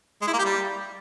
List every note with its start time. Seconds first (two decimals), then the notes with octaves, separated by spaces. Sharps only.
0.22 G#3
0.27 E4
0.33 A#3
0.39 G4
0.45 G3